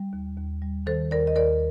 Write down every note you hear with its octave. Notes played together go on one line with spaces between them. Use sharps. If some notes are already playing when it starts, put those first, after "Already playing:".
Already playing: G3
D#2
D#2
G3
D#3 A4 C5
D#2 A#4 D5
D#5
D#2 A#4 D5